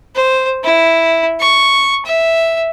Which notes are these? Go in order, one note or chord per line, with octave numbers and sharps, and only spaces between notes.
C5
E4
C#6
E5